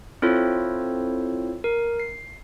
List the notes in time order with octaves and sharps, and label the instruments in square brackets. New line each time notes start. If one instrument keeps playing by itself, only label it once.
[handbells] C4 E4 F4 A4 C5 C#5
A#4
C7